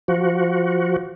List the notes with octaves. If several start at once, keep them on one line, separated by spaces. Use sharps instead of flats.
F3 F#4